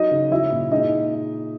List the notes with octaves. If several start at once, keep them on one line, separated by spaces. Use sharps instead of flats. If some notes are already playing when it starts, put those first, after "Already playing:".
Already playing: F#3 D#4 D#5
C#3
F#3 E4 E5
A#2
G#3 D#4 D#5